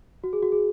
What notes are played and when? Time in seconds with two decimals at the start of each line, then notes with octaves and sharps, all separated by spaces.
0.24 F#4
0.33 G#4
0.43 F#4
0.52 G#4